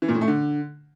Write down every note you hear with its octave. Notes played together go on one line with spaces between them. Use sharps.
E3
A#2
A2
A3
D3